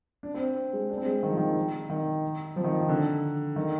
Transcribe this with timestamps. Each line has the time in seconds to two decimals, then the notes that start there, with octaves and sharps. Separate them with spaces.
0.23 D4
0.34 C4
0.73 G#3
0.90 D4
0.97 C4
1.06 G#3
1.23 D#3
1.30 F3
1.37 D#3
1.90 D#3
2.56 F3
2.64 D#3
2.81 D#3
2.89 D3
3.56 D#3